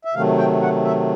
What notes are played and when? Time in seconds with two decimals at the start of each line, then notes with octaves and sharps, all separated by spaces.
0.05 E5
0.14 C3 D#3 F#3 A3 F5
0.38 G5
0.62 F#5
0.85 E5